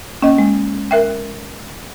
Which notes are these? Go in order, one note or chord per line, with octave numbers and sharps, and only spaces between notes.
A#3 C#4 D#5
G#3
A#4 E5 G5